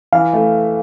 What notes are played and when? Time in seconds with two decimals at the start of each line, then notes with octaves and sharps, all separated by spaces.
0.13 E3 F5
0.33 A3